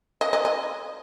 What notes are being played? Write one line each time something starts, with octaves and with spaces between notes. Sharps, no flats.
D#5
D#5
D#5